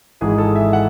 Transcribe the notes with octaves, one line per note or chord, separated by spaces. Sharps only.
G#1 G#2 E3 G#4
A4
E5
F#5